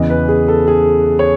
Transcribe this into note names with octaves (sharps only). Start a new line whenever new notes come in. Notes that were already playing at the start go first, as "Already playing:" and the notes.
Already playing: E2 C#3 E3 B3 D#5
B4
G#4
A4
G#4
C#5